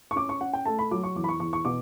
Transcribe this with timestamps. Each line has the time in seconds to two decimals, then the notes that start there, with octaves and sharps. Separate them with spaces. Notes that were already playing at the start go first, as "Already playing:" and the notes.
0.11 C#6
0.16 C#4 D6
0.29 C#6
0.41 C#4 F#5
0.54 G5
0.65 A3 A5
0.79 B5
0.91 F#3 D6
1.03 C#6
1.16 E2 D6
1.24 B5
1.29 C#6
1.40 E2 C#6
1.53 C#6
1.65 B2 D6